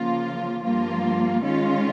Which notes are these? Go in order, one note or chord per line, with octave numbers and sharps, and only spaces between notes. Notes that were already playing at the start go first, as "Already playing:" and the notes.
Already playing: C#3 F3 A#3 F4
G2 F3 A#3 F4
D#3 G#3 C#4 F4